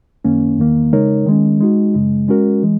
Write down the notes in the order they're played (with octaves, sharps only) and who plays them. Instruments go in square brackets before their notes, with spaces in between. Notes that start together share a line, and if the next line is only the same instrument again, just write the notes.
[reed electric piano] F#2 D#3 A#3 C#4
E2 D#3 A#3
C#3 G#3 D#4 A#4 C#5
D#3 G#3 C#4
G#3 D#4 F#4
F#2 C#3 G#3
G#3 C#4 F#4 A#4
E3 G#3